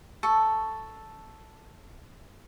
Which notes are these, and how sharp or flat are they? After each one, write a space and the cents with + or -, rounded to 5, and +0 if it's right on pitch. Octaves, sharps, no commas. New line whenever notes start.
A4 +0 C#6 +0